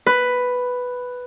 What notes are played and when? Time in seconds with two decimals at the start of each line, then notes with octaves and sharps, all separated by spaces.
0.06 B4